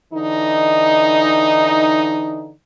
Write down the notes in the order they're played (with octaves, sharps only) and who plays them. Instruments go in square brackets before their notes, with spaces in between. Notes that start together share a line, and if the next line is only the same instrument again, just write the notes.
[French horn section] D3 E3 D#4